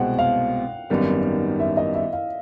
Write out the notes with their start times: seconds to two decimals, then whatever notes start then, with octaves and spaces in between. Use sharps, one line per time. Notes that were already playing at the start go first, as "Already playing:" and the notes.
Already playing: C2 B2 G#3 C4 F#5 G5
0.19 F5
0.90 G#1 F#2 D#3 G3 B3
1.59 E5
1.77 D#5
1.95 E5
2.13 F5